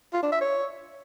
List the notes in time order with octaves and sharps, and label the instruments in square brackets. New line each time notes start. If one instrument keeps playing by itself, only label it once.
[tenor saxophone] F4
D4
E5
C#5